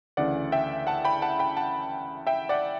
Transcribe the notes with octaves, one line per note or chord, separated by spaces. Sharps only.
D2 C#3 E3 D5 F#5
E5 G5
F#5 A5
G5 B5
F#5 A5
G5 B5
F#5 A5
E5 G5
D5 F#5